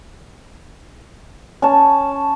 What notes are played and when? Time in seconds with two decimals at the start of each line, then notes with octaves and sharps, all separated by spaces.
1.62 C#4 A5